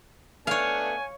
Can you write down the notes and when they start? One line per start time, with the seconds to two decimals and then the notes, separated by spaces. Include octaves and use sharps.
0.47 A3 B3 D4 C#5 F5 G#5